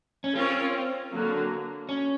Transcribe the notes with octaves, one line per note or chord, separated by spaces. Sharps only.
C#4
C4 C#4 F4 A#4 C#5
D3 F#3 A#3
C#4